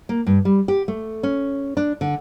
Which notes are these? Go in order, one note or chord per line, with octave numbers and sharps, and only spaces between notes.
A#3
G2
G3
G4
A3
C#4
D4
D3